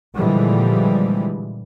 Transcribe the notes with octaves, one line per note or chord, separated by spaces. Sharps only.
A#2 D3 E3 F3 G3 G#3